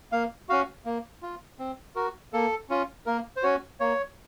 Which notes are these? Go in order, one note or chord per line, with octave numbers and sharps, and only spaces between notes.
A#3 F5
C#4 F#4 F5
A#3
F4
C4
F#4 A#4
A#3 A4
C#4 F4
A#3 A#4
C5
C#4 F#4 C#5
A#3 C#5